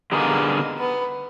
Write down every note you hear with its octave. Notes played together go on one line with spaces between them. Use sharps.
D3 G3 A#3 B3 D#4 G#4
B3